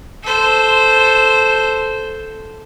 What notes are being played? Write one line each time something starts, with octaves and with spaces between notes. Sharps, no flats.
A4 C5